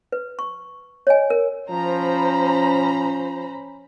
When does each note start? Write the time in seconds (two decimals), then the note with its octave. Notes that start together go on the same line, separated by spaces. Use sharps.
0.12 B4
0.39 C#6
1.07 C#5 D#5 G#5
1.30 A#4
1.70 F3 C#4 C5 A#5 B5